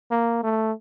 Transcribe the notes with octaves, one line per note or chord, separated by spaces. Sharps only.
A#3
A3